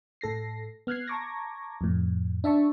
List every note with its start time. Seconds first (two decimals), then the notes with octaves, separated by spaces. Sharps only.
0.21 A2 A4 A#6 C7
0.87 B3 F6 F#6 G#6 C7
1.08 A5 A#5 C#6 D6 G#6 A#6
1.81 F2 A2
2.44 D4 E5 A5 C#6